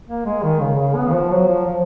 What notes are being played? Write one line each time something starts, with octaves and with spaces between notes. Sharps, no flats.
A#3
G#3
D#3
C#3
C#3
B3
D#3
F3
F#3
F3
F3